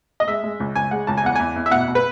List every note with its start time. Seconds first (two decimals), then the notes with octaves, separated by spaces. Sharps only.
0.20 D#5
0.27 G#3 E5
0.44 G#3
0.60 C#2
0.76 C#2 G#5
0.91 G#3 F#5
1.07 C#2 A5
1.17 G#5
1.23 E2 F#5
1.35 E2 G#5
1.56 E2
1.66 E5
1.71 B2 F#5
1.88 B2
1.95 B4